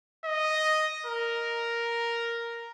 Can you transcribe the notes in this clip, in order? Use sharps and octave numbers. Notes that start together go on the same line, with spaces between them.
D#5
A#4